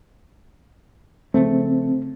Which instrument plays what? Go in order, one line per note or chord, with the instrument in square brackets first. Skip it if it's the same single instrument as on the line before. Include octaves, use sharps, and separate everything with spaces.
[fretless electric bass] C#3 F3 A3 [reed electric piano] C4